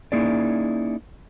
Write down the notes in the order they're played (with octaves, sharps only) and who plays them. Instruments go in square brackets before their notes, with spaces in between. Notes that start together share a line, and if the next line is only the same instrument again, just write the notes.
[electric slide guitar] A#3 C#4 D#4 E4 G#4 D5